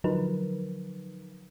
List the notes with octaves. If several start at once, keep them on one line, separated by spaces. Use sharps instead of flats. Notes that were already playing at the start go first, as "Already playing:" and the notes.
D3 F3 F#3 D#4 A#4 B4